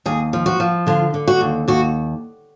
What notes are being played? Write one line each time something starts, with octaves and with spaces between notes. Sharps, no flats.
D#2 G#4
F3
F#4
F3
D3 F4
D3
F#4
D#2
D#2 F#4